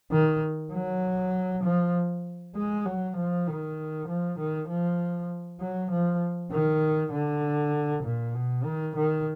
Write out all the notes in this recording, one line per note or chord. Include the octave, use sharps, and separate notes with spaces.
D#3
F#3
F3
G#3
F#3
F3
D#3
F3
D#3
F3
F#3
F3
D#3
D3
A#2
B2
D#3
D#3